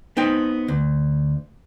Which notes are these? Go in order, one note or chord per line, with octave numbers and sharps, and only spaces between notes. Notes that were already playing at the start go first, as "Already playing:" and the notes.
B3 C4 D#4 G5
D2